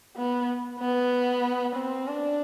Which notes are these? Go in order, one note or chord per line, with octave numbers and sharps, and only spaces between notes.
B3
B3
C4
D4